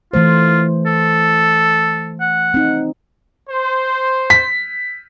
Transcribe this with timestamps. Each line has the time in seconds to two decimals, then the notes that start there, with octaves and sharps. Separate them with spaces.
0.14 E3 A3 F4 C5
0.86 A4
2.21 F#5
2.54 C4 D#4
3.50 C5
4.30 B6